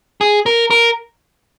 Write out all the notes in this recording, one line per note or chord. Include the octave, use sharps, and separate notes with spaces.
G#4
A#4
A#4